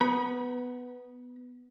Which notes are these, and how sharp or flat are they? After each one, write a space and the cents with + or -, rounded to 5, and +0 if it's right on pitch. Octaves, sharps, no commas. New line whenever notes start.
B3 +5 B5 -30